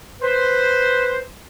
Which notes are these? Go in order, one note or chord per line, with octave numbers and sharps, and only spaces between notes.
B4 C5